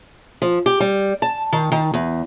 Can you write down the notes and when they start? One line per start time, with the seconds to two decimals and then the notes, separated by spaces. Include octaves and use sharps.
0.42 F3
0.66 G4
0.80 G3
1.22 A5
1.53 D#3
1.72 D#3
1.94 E2